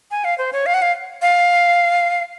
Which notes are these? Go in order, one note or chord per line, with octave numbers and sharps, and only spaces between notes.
G#5
F5
C5
C#5
F5
F#5
F5
F5